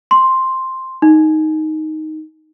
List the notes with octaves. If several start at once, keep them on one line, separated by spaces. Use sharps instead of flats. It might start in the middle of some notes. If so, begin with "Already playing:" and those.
C6
D#4